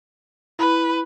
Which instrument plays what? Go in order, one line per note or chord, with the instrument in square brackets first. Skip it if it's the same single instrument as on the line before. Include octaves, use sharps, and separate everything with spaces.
[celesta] E4 B5 [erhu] B4